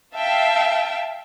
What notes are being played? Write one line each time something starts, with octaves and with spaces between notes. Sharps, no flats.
E5 F5 G5 A5